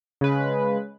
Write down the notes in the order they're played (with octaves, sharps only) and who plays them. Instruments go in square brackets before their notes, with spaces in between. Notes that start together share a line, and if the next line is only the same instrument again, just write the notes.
[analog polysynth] C#3 G#3 B4